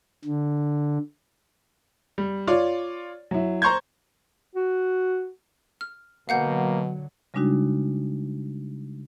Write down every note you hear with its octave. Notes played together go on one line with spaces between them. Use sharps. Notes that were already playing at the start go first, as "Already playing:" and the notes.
D3
G3
F4 C#5 D5
F#3 E4
C5 A#5 C6 C#6 G6 G#6
F#4
F6
B2 D3 F#3 A#3 F5 F#5 G6
C#3 G3 G#3 D4 D#4 F#4